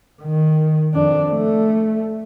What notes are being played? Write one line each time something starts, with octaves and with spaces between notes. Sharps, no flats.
D#3
F2 D4
A3